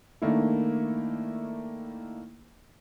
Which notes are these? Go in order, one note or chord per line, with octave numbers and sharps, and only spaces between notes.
D#3 A3 A#3 D4 E4